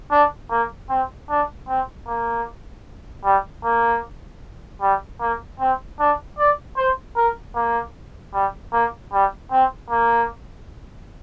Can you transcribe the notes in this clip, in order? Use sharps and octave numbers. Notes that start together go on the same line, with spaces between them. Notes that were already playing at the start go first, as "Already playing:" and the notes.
D4
A#3
C4
D4
C4
A#3
G3
A#3
G3
A#3
C4
D4
D5
C5
A#4
A#3
G3
A#3
G3
C4
A#3